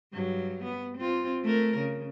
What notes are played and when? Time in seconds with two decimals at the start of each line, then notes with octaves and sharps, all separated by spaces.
0.13 G2 F#3
0.64 B3
0.97 C4 F4
1.43 A3 A#4
1.77 C#3